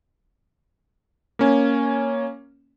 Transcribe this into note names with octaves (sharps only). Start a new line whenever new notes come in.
A#3 C#4